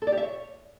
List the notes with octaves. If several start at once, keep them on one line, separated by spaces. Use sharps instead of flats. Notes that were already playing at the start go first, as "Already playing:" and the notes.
A4
D5
G4
E5
C#5